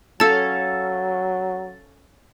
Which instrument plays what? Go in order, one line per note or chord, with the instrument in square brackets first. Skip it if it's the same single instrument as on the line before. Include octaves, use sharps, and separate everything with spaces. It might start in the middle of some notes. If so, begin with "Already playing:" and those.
[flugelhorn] F#3 [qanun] C#4 A4 F5 [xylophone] A5 E6 [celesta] A6